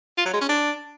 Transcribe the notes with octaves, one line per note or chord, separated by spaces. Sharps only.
F4
F#3
G#3
C#4
D4